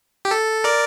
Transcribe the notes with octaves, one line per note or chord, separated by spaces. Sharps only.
G4
A4
A#4 D5